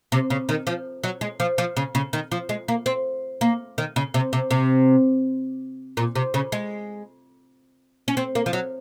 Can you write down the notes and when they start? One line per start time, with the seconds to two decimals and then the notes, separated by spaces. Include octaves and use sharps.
0.12 C3
0.30 C#3
0.49 D#3
0.67 F3
1.04 F#3
1.21 G#3
1.40 F3
1.58 F3
1.77 C#3
1.95 C#3
2.13 D#3
2.31 F3
2.49 G#3
2.68 A#3
2.86 C4
3.41 A#3
3.78 D#3
3.96 C#3
4.14 C3
4.33 C3
4.51 C3
5.97 A#2
6.16 C3
6.34 C#3
6.52 G#3
8.08 C#4
8.17 C4
8.35 A#3
8.46 F3
8.53 F#3